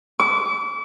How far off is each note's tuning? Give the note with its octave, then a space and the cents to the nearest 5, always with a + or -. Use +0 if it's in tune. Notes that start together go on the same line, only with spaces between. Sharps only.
D6 -35